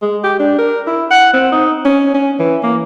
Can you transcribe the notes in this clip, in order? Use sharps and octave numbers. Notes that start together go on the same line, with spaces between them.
G#3
G4
D4
A#4
E4
F#5
C4
D#4
C#4
C#4
E3
A#3